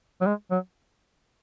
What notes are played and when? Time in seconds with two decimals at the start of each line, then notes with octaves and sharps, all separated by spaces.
0.21 F#3
0.26 G#3
0.51 F#3